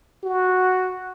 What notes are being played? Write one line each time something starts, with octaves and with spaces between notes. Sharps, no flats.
F#4